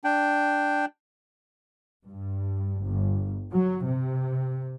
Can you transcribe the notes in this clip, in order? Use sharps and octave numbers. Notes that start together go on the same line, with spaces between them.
D4 G5
G2
G1
F#3
C3